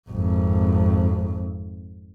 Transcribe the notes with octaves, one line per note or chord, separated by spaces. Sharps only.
G#1 F2